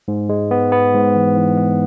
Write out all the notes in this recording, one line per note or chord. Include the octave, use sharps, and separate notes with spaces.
G#2
G#3
B3
B3
G#2
E3
E3
B3